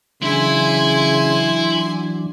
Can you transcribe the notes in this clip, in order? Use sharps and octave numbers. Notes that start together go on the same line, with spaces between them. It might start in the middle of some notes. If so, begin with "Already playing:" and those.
C#3 E3 F#3 D4 E4 G#5 C6